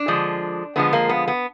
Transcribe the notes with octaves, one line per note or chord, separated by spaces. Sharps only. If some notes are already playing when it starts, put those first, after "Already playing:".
Already playing: D4
D3 F3 G#3
D3 F3 G#3 B3
A#3
B3
B3